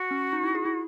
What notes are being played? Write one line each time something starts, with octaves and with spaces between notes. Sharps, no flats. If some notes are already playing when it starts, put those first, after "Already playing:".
Already playing: F#4
C#4
D#4
E4
G#4
E4